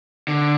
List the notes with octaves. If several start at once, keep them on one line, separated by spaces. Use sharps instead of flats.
D3